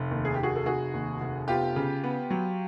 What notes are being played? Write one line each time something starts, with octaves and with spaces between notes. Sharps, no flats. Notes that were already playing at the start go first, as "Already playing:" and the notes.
Already playing: F1
D#2
G#4
G4
F1 F#4 G#4
A4
F1 F#4 G#4
D#2
F1
B3 F4 G4
C#3
B3
F#3